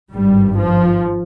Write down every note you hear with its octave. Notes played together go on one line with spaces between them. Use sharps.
G#1 G2 G3
F3